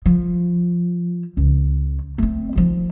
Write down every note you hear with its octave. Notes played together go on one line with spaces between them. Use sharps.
F3
C#2
A3 C4
D#3 F3